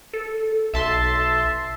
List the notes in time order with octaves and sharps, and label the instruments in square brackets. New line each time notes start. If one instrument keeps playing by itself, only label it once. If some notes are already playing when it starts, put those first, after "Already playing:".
[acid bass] A4
[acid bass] B1 [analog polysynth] E5 A5 C6